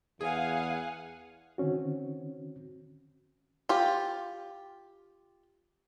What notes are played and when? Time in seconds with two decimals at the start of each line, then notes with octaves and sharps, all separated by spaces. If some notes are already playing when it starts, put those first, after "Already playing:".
0.21 E2 G#4 F5 F#5 G#5
1.58 D3 D#3 C4 C#4 F#4
3.69 F4 G4